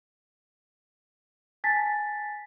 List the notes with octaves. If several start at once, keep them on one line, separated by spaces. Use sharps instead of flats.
G#5 A5 A6 B6